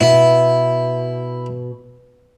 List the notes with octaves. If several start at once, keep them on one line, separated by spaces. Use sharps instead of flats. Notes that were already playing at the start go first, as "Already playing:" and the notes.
B2 E4